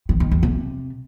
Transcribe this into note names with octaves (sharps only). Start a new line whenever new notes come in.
D#3
D#3
E2
C3